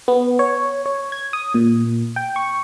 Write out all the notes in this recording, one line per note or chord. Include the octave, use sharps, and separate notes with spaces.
B3
C#5
C#5
G#6
D#6
A#2
G5
C#6